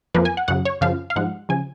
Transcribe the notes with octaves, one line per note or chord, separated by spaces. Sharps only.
F2 F3 A#3 B4
G#5
F#5
F#2 C#3 F#3 F#5
C#5
F#2 C#3 F3 F5
F5
G#2 F3 G#3 F#5
C#3 F3 G#5